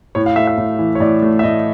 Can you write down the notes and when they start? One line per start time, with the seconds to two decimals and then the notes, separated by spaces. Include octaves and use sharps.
0.15 A2 C#5
0.26 F5
0.36 A3 E5
0.47 E5
0.58 A2
0.79 E3
0.95 C#5
1.00 A2 D5
1.22 A3
1.39 E5
1.43 A2 D#5